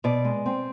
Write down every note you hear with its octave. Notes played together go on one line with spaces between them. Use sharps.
B2 D5
G#3
C4